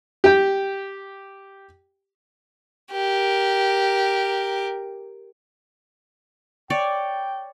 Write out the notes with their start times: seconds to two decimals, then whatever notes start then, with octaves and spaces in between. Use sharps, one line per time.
0.24 G4 G5
2.92 G4 A#4
6.70 C#5 D5 G5